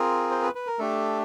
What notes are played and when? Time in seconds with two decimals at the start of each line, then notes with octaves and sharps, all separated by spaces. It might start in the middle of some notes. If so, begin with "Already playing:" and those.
Already playing: C4 F4 G#4 A#4
0.31 C5
0.42 B4
0.55 B4
0.67 A#4
0.79 A3 D4 G4 A4